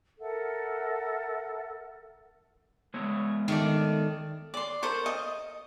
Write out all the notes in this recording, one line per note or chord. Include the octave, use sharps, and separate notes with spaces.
A4 A#4 E5 F#5
G#3 B3 C#5
D#3 A3 D5
D5 C6
A4 A#4 C5 C#6
D#5